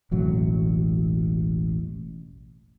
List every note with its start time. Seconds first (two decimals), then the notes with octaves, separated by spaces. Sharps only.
0.11 E1 A1 F#3